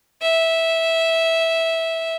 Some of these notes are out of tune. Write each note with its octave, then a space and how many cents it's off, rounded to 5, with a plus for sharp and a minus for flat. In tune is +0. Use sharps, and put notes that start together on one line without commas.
E5 -10